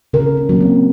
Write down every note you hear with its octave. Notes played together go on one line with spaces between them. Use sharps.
C#3 A#4
C#4
F#3 A#3
C4